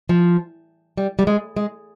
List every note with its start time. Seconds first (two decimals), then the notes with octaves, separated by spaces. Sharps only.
0.09 F3
0.97 G3
1.19 G3
1.27 G#3
1.56 G#3